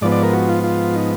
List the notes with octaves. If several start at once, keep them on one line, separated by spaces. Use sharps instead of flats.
G#2 F3 B3 D5
D5
A#4
F#4
F4
F4
D#4